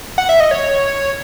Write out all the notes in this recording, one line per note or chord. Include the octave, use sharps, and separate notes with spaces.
F#5
E5
D#5
C#5